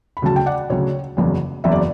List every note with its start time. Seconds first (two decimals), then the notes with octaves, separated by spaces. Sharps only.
0.17 B5
0.22 D2 C#3 F#3 A5
0.36 G5
0.46 D5 F#5
0.70 D2 C#3 F#3 C#5
1.17 F#1 E2 C#3 F#3
1.64 F#1 E2 C#3 F#3 E5
1.72 D5